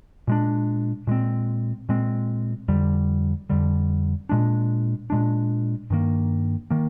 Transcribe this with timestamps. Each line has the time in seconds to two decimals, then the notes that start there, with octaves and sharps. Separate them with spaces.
0.27 A#2 G#3 D4
1.07 A#2 G#3 C4
1.89 A#2 G#3 C4
2.68 F2 D3 G3
3.50 F2 D3 G3
4.29 A#2 G#3 D4
5.10 A#2 G#3 D4
5.90 G2 D#3 A#3
6.70 D#3 A#3